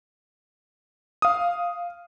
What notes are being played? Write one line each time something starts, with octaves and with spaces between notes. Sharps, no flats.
F5 D#6